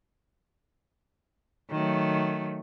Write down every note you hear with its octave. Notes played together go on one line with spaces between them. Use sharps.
D#3 F#3 A3